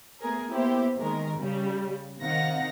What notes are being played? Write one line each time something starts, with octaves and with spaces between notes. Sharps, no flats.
A3 B3 G#4 A#4
A#3 B3 E4 G4 C5
D#3 G#3 A#4
C#3 G3
C3 D#3 D#4 F5 F#5 A#6